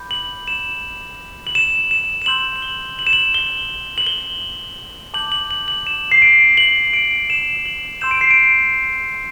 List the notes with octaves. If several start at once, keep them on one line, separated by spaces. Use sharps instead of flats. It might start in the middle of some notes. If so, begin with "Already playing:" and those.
Already playing: B5 D6 G6
F#7
E7
F#7
E7
E7
E7
C6 E6 G6 F#7
F#7
G7
F#7
E7
F#7
G7
F#7
G7
A5 D6 G6 F#7
F#7
F#7
F#7
E7
C7
D7
F#7
D7
E7
F#7
C6 E6 G6 E7
D7
C7
D7